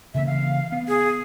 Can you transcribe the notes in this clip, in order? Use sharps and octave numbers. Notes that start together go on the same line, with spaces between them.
C#3 E3 A#3 E5
F5
B3
G#4